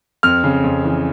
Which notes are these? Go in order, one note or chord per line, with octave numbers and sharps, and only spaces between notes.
F2 F6
C#3
F2
E3